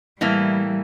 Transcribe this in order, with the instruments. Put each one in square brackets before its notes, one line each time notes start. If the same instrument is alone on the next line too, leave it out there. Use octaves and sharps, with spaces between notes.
[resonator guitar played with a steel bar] A2 E3 A#3 E4 [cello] G3